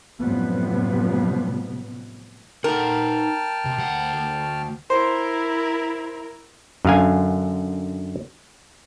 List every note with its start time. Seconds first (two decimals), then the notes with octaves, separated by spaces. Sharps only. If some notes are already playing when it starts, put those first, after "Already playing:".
0.20 F#2 A2 C3 F3 G3 B3
2.64 D#4 A#4 F#5 G5 A5 F6
3.65 C3
3.79 D2 F#5
4.90 E4 A#4 C5
6.85 F#2 D3 F5 G#5